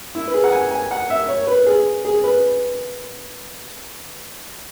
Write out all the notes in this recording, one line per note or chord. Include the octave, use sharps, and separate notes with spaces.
E4
B4
G#4
F#5
G#5
G#5
F#5
E5
C#5
B4
G#4
G#4
B4